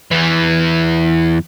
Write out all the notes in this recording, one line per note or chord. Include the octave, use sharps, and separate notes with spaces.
E2 E3